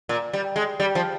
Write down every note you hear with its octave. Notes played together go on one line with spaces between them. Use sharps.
A#2
G3
G#3
G3
F3